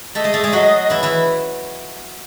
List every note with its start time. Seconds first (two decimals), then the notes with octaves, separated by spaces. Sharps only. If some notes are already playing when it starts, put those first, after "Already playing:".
0.15 A3 A4 D#5
0.24 G#3 G#4
0.34 A3 A4
0.44 G#3 G#4
0.52 F#3 F#4 D#5
0.90 E3 E4
1.03 E3 E4